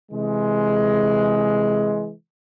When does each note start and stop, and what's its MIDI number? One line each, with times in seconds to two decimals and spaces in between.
0.11 2.11 48
0.11 2.11 52
0.11 2.11 56